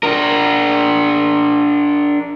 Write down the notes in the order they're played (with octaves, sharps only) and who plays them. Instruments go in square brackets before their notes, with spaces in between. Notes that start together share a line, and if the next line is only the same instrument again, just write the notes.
[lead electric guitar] D4 A#4